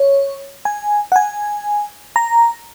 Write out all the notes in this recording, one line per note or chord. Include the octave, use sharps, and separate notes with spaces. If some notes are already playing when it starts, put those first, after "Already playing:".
Already playing: C#5
G#5
F#5
G#5
A#5